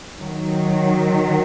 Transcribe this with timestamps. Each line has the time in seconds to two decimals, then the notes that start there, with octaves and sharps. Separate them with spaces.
0.17 D#3 F#3